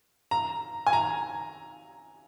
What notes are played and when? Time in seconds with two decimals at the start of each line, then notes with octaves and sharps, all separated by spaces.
0.31 A#5
0.87 G#5
0.93 A#5